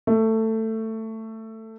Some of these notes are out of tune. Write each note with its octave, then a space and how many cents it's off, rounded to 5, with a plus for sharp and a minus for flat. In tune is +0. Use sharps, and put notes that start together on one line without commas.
A3 +15